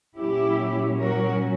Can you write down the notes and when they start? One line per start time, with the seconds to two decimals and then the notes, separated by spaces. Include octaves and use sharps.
0.18 A#2 F#3 C#4 E4 G4
1.00 F#4 A#4